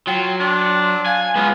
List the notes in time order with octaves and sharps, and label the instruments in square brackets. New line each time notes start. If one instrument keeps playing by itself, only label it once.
[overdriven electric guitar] F#3 [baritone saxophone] F4 [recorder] G5
[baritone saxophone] D4 [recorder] C6
[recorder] F5 [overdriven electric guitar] G#5
[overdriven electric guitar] G#3 F4 [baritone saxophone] B3